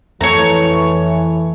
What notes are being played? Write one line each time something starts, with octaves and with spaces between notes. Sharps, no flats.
F2 E3 A3 C4 C#5 A#5